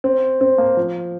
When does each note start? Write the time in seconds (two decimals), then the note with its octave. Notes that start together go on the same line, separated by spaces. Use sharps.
0.04 C4
0.41 C4
0.58 A#3
0.77 F3